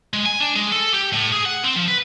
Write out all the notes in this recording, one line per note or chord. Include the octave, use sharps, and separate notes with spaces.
G#3
G#5
D4
G#3
A4
G4
A2
G#4
F#5
C4
F3
B4